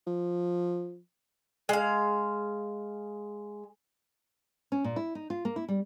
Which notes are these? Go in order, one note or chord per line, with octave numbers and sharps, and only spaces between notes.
F3
G#3 F5
C#4
A#2
E4
D#4
F4
A#3
E4
G3